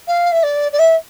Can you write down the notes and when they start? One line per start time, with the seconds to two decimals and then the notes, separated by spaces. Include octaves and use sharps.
0.08 F5
0.32 E5
0.43 D5
0.73 D5
0.79 E5